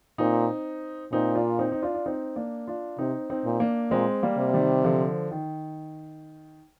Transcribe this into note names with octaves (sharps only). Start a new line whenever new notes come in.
A#2 C4 D#4
A#2 C4 D#4
D4 F4
C4 D#4
D#4
D4 F4
D4
C4 D#4
A#3 D4
D4 F4
C3 C4 D#4
C4 D#4
A#2
A#3 D4
A#2 G#3 C4
G3 A#3
C3
D#3 G3
D3 F3
D#3